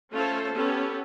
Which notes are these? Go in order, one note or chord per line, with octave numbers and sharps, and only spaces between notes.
A3 C#4 F4 A4 C5
B3 C#4 G4 A4